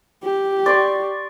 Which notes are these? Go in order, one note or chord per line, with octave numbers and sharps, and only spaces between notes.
G4
D5 C6 C#6